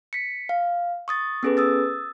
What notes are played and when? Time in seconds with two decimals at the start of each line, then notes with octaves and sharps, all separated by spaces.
0.13 B6 C#7
0.49 F5
1.08 C#6 D#6 A6
1.43 B3 C#4 G#4 A4 B4
1.57 D#6 E6 A6